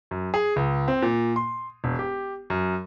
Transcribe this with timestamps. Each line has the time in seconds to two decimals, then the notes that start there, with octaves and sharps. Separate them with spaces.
0.11 F#2
0.34 G#4
0.56 C#2
0.88 C4
1.02 A#2
1.36 C6
1.84 E1
1.99 G4
2.50 F#2